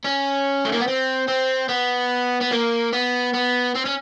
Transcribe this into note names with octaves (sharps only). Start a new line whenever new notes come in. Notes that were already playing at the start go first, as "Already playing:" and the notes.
C#4
A3
A#3
B3
C4
C4
B3
B3
A#3
B3
B3
C4
C#4